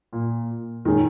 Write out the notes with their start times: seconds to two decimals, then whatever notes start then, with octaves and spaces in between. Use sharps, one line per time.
0.13 A#2
0.85 A#2 D#3 G#3 C#4 G#4 C#5